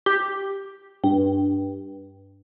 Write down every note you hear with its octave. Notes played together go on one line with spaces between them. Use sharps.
G4
G2